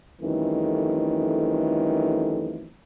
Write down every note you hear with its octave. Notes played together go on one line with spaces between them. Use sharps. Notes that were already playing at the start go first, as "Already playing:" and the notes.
F2 D#3 E3 G3 A3 C#4